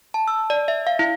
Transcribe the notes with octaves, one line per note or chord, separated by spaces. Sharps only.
A5
E6
D5
E5
F5
E4